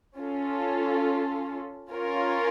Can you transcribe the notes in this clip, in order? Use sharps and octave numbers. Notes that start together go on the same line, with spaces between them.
C#4 F4 A4
C#4 F4 A#4 C#5